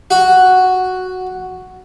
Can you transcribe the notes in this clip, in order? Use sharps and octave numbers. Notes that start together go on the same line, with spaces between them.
F#4